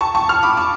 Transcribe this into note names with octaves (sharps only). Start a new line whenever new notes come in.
A5 C#6
A5 C#6
C#6 F6
B5 D6
A5 C#6